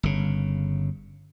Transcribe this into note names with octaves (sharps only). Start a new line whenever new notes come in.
G1 C#3